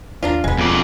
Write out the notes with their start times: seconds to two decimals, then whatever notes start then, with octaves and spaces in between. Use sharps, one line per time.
0.23 D#2 A#3 D4 F4
0.44 E1 G#3 B3 D#4
0.58 F2 D5